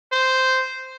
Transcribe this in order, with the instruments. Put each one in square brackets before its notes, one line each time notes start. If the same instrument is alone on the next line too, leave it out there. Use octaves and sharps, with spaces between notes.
[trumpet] C5